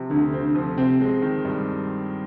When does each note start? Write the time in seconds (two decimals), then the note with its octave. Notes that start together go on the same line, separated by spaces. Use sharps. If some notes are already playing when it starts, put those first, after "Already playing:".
Already playing: C3 F3 C4
0.10 D2 D3
0.33 C4
0.44 D3
0.55 F3
0.78 C3 C4
1.00 G#3
1.22 D#3
1.45 G2